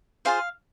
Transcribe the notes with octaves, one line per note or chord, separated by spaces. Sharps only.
F4 G#4 C5 F5